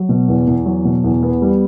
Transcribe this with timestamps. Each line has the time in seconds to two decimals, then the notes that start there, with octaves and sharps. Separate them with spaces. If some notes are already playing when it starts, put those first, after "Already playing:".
Already playing: F#3
0.09 B2
0.28 E2
0.47 E2
0.66 F#3
0.85 B2
1.04 E2
1.23 B3
1.42 G3